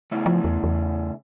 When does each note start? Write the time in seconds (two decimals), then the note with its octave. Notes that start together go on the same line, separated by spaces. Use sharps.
0.11 C#3 A3 E4
0.26 F3
0.44 E2
0.64 E2